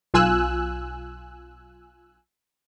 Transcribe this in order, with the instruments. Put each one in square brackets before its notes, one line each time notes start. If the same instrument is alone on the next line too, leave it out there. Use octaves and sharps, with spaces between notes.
[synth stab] B1 F4 G#5 E6 F#6